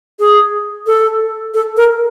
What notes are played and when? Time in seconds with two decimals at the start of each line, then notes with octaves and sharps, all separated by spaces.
0.19 G#4
0.87 A4
1.54 A4
1.77 A#4